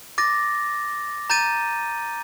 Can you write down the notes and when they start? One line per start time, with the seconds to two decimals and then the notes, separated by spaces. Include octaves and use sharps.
0.18 D6 A6 A#6
1.30 A#5 G6 A6 D#7